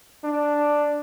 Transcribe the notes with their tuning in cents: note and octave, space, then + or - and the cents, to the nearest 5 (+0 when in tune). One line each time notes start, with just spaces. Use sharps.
D4 +5